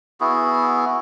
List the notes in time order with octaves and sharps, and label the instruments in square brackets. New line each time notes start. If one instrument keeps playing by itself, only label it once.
[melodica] B3 E4 F#4 G#4